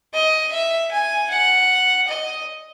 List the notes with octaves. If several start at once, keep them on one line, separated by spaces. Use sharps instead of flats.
D#5
E5
G#5
F#5
D#5